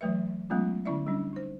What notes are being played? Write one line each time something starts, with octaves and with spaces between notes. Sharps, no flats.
E3 F#3 A3 B4 E5
F#3 G#3 A3 B3 C#4 F4
D3 C#4 E4 D5 E5
G3 C#4 D4
D#4 C5